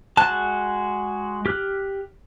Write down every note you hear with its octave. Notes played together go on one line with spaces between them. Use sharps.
G#3 F#4 A5 F#6
G4 F6 F#6